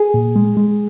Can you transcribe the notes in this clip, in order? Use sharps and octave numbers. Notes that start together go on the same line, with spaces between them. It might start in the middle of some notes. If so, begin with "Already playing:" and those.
Already playing: G#4
A#2
G#3
G#3